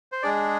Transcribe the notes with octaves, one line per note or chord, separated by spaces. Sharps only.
C5
G#3 D4 G#4 D5